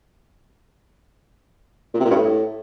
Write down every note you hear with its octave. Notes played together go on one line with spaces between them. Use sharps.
A#2
C3
A#2
G2
A2